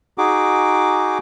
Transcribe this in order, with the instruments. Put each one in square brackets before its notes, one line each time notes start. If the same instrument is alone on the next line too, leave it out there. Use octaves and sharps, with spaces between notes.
[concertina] D#4 F#4 G#4 D6